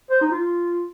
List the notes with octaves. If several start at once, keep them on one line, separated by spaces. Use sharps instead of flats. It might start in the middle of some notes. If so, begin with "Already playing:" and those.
C5
D#4
F4